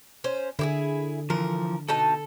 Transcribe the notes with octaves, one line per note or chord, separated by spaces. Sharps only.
C#4 C5
D3 E4 G4 G#4
E3 F3 A#4
B2 D#4 A4 A5